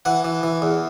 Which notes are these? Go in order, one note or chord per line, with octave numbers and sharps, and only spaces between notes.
E3 F#5
E3
E3
E2